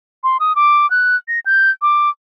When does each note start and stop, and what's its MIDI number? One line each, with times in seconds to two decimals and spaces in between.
0.24 0.37 84
0.40 0.55 87
0.56 0.89 86
0.90 1.16 90
1.28 1.40 94
1.46 1.70 91
1.82 2.10 86